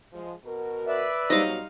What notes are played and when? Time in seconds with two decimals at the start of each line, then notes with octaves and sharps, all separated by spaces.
0.13 F3 G#3
0.44 B2 F#4 A#4
0.88 B4 D5 E5
1.30 B2 F#3 G3 D#4 C5 D#5 F5